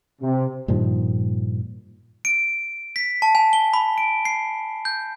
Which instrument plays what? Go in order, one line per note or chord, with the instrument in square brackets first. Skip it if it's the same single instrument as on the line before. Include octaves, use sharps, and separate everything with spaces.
[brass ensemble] C3
[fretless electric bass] G2 A#2 D#3 F3
[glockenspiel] D7
B6
A5
G#5
G7
B5
D7
C7
G6